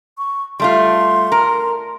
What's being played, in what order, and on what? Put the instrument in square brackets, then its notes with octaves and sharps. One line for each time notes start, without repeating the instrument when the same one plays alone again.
[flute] C#6
[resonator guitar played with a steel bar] G3 A3 F4 [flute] C6
[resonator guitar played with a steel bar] A#4